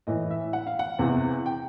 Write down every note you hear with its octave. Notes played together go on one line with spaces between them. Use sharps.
A2 E3 D#5
E5
F#5
F5
F#5
E2 C3 E3
G5